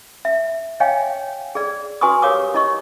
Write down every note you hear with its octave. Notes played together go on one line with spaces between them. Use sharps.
E5
C#5 D#5 F5 G5 G#5
G#4 D5
F#4 B4 G#5 C6 C#6 D#6
G4 A#4 C#5 F5 D6 D#6
E4 D#5 C#6